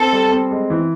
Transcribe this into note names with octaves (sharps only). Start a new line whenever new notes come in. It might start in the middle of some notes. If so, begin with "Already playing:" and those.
Already playing: C4 A4
G3
C4
G#3
E3